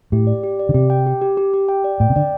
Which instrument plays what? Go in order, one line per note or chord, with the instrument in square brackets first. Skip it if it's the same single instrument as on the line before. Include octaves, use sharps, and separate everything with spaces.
[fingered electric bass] A2 [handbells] G4
[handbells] D5
G4
D5
[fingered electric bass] D3
[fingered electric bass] C3 [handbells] G4
[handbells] G5
G4
G4
G4
G4
G5
D5
[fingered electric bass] A2 [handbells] G5
[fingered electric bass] C3
[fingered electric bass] D3 [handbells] D5